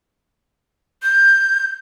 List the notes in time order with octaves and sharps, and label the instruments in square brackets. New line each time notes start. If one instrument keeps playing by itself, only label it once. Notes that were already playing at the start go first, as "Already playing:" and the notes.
[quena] G6